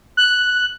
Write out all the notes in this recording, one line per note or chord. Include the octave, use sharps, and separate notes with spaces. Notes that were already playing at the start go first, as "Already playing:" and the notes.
F#6